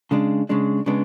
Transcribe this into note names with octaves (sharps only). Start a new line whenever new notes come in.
C#3 G#3 D4
C#3 G#3 D4
C#3 G#3 B3 D4